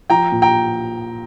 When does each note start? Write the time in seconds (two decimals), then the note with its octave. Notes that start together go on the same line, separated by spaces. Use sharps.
0.10 F3 G5 A#5
0.32 A#2
0.42 G5 A#5